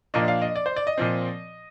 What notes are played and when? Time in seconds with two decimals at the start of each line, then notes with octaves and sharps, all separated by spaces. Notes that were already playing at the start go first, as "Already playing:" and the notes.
0.14 A#2 F3 A#3 D4 D#5
0.28 F5
0.42 D#5
0.56 D5
0.66 C5
0.76 D5
0.87 D#5
0.98 A#2 F3 C4